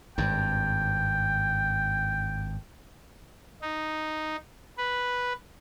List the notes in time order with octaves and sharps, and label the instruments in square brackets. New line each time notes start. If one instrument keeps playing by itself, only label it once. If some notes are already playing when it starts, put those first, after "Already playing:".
[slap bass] G#1 G2 [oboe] G5
[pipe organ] D#4
B4